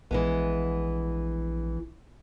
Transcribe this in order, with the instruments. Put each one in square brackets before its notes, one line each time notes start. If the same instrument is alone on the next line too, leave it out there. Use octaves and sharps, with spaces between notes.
[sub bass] A#1 [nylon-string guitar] E3 G#3 B3